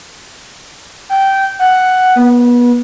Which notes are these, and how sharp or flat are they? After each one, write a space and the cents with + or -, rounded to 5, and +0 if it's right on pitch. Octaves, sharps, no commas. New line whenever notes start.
G5 -15
F#5 +5
B3 -30